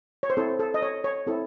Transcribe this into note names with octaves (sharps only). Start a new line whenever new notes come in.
C#5
C5
C4 E4 A4
A4
D#5
C#5
C#5
C4 E4 A4